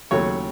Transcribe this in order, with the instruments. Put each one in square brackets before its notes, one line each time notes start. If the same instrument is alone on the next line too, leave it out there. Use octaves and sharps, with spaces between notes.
[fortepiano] D#2 C#3 F#3 A3 C#5